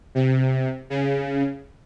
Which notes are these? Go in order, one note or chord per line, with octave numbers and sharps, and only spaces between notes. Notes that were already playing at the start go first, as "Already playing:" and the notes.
C3
C#3